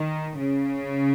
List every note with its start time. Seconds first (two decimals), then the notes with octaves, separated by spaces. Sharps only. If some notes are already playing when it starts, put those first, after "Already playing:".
Already playing: D#3
0.36 C#3